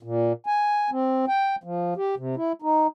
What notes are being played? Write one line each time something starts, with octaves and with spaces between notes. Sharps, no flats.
A#2
G#5
C4
G5
F3
G4
C3
E4
D#4